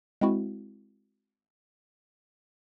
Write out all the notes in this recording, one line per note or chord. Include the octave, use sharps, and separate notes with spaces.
G#3 C4 E4 F#4